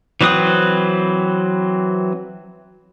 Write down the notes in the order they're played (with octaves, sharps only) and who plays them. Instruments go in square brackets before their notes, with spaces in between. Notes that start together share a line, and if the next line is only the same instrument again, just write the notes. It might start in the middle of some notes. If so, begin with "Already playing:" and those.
[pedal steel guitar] E3 F#3 C4 B4 D#6